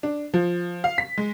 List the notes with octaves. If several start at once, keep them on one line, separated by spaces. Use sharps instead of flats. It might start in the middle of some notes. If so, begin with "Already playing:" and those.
D4
F3
F5
B6
G#3